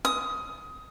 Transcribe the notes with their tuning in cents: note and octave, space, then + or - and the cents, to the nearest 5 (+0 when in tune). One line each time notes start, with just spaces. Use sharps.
D#6 +15